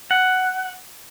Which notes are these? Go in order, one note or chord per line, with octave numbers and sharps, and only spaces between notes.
F#5